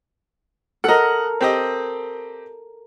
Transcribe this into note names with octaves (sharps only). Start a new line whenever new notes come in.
A4 A#4 D#5 F#5
C4 G4 D#5